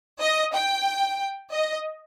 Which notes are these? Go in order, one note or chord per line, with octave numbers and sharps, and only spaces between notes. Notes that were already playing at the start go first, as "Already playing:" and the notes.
D#5
G5
D#5